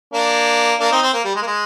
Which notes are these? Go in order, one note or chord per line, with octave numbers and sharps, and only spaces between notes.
A#3 D4
A#3 D4
C4 D#4
C4
A#3
G3
G#3
A#3
G#3